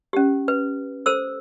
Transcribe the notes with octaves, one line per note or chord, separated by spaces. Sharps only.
C#4 G4
B4
A4 C5 E6